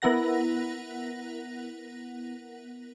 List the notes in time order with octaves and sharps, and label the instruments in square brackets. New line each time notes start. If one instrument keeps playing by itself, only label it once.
[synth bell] B3 E4 A#4 F#5 A#6